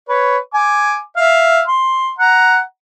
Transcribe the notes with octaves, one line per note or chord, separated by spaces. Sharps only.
B4 C#5
G#5 D6
E5 F5
C6
F#5 A#5